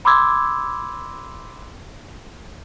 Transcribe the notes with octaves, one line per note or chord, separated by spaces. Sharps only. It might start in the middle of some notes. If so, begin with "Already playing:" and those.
B5 C6 D6 E6 G#6